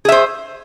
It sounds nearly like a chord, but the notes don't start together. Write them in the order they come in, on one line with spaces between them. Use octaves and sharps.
G#4 E5 C5